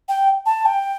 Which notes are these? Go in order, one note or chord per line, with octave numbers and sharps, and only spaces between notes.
G5
A5
G5